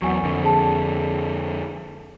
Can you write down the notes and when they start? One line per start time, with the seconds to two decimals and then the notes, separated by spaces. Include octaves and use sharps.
0.02 E2 F#3 F#5 G#5 C#6
0.23 F2 D3
0.43 G#4 A5